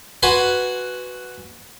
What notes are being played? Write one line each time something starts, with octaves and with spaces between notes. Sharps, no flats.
F#4 B4 G#5 C6 C#6